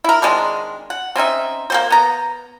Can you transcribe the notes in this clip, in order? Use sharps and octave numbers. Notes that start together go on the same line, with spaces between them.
E4 A#4
D#3 G#3 C4 D4
F#5
C4 C#4 D#4 E5
A#3 C4 C5
B3 A#5